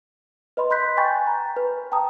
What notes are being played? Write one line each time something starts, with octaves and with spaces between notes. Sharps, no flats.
B4 D#5 B5 C6
B5 C6 F#6 G6 B6
G5 G#5 B5 C#6 G6 A6
A#5
B4
G5 A5 A#5 D#6